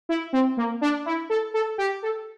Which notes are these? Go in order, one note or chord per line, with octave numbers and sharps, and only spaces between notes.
E4
C4
A#3
D4
E4
A4
A4
G4
A4